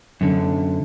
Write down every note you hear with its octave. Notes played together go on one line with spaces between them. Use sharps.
F#2 D3